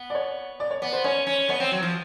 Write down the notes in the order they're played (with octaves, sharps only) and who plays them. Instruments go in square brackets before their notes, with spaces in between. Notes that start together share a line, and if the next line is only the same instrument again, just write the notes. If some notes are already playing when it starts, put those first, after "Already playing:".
Already playing: [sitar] B3
[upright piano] D5
C#5
D5
C#5
[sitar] B3 [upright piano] D5
[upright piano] C5
[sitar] C#4 [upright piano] C#5
[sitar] C#4
[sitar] B3 [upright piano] C#5
[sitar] C4
F#3
F3